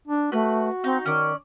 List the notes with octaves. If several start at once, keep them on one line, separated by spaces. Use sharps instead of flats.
D4
A3 F#4 B4 F#6
C4 D#4
D#3 C#4 D5